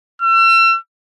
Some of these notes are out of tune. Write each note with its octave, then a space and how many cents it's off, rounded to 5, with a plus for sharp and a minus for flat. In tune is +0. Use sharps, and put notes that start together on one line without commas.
E6 +40